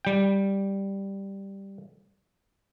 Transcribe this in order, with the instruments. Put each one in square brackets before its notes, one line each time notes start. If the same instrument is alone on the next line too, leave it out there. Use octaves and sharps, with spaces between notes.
[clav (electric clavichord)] G3 G5